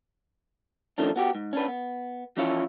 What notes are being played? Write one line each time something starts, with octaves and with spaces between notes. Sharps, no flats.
D3 D#3 F3 A3 C#4 D4
B3 F#4 G4
G#2
C#4 D4 B4
B3
E3 F3 C#4 E4 F4 C#5